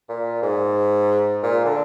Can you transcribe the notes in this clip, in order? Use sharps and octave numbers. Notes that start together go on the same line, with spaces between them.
A#2
G#2
A#2
D3